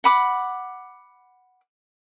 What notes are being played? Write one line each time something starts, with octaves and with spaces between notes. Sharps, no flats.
F#5 B5 D6